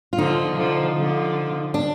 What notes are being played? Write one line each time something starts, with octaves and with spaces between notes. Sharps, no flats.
F4
D3 F3 D#4
D3 F3
D3 F3
D4